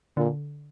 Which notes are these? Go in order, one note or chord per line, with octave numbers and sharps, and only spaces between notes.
A#2 D3